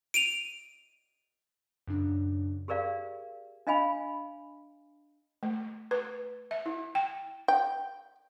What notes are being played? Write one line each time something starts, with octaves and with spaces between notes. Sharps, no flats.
D7 D#7 F7
F#2 C#3 D4
G4 G#4 A#4 D5 F5
D4 D#5 F5 G#5 B5
A3
B4
E5
E4
G5
G5